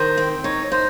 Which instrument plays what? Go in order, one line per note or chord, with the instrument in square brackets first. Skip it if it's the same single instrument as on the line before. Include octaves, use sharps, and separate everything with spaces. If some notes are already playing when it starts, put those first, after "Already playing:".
Already playing: [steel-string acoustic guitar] D#3 [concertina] C5
[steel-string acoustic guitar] C4
[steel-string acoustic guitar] D#4 [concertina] C#5
[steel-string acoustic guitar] D#4 [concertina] C5